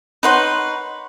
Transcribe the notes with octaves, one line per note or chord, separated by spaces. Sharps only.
D#4 B4 C#5 F#5 B5 C6